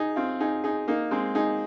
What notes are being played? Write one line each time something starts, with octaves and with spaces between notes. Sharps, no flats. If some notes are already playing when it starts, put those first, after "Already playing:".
Already playing: D#4 G#4
C4 F4
D#4 G#4
D#4 G#4
A#3 D#4
G#3 C4
D#4 G#4